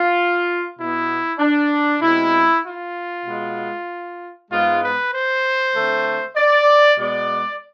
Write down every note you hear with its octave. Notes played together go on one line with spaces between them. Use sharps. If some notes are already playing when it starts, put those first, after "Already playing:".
Already playing: F4
B2 B3 E4
D4
B2 G#3 C4 E4
F4
B2 G#3 B3
G#2 G#3 B3 F4
B4
C5
D3 A3 C4
D5
B2 G#3 B3 D5